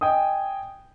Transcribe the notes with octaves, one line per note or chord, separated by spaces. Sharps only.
D#5 G5 G#5 D#6